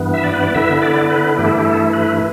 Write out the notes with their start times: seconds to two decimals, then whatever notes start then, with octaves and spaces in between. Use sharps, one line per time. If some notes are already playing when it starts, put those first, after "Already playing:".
Already playing: G2 E3 B3
0.14 E5
0.24 D5
0.34 B4
0.43 D5
0.55 D3 B3 E4 E5
0.82 D5
1.10 B4
1.37 G2 E3 A3 E4 G4
1.46 A4
1.54 G4
1.65 A4
1.93 B4